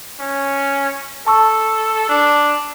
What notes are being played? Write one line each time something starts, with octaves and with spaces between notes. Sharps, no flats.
C#4
A4 A5 C#6 E6
D4